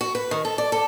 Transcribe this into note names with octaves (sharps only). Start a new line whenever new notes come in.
F#4
B4
D#3
A4
D5
A4